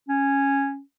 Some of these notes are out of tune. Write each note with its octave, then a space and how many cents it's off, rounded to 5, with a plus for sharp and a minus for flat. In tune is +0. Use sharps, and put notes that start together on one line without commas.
C#4 -5